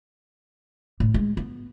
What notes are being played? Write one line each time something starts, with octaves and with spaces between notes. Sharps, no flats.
A2
G#3
B3